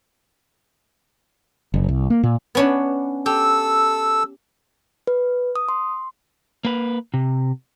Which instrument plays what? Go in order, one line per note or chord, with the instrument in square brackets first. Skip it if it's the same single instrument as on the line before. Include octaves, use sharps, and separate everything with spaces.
[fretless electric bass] F#1
C2
A#3
A#2
[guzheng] B3 C#4 D4
[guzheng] G4 [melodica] A4 E6
[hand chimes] B4
D#6
C6
[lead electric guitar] A#3 B4
C3